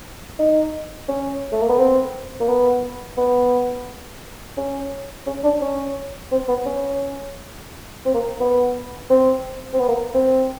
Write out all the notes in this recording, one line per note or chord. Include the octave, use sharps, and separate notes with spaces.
D#4
C#4
A3
A#3
B3
C4
A#3
B3
B3
C#4
C#4
D4
C#4
C4
B3
C#4
C4
A#3
B3
C4
C4
B3
A#3
C4